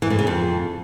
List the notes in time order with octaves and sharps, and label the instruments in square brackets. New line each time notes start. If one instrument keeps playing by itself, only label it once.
[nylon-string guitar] E3
A2
C#3
F2